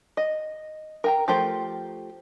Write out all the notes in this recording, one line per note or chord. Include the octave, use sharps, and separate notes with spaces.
D#5
A#4 G5 A#5
F3 A3 G4 A#4 C5